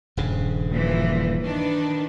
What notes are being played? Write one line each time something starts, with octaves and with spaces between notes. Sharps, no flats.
D#1 G2 C#3
A#2 E3 F3
D#3 D4 B4